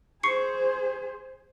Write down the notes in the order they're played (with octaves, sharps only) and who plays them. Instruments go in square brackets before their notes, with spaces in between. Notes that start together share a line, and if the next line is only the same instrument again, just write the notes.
[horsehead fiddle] G#4 C5 [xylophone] C#6 C7 C#7